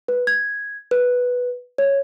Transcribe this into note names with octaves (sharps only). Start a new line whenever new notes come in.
B4
G#6
B4
C#5